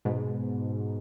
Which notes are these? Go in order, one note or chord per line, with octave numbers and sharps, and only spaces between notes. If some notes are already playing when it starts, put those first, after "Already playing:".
G#2 B2